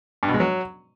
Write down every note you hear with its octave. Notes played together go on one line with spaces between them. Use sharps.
G2
B2
G#3
F#3